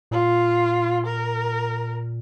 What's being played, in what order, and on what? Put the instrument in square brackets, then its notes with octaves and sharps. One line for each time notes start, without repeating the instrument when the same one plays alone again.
[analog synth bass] A#2 [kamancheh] F4
[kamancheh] A#4